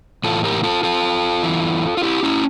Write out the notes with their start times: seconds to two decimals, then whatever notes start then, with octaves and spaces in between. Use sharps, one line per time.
0.24 A2 E3 F4 A4
0.44 G4 A#4
0.63 F4 A4
0.83 F4 A4
1.43 E2 E3
1.97 F4
2.03 E4 G4
2.23 C#4 E4